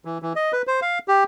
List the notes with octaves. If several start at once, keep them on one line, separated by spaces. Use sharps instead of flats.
E3
E3
D#5
B4
C5
F5
G4